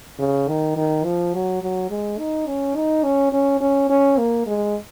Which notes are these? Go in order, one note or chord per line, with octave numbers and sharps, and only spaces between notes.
C#3
D#3
D#3
F3
F#3
F#3
G#3
D#4
C#4
D#4
C#4
C#4
C#4
C#4
A#3
G#3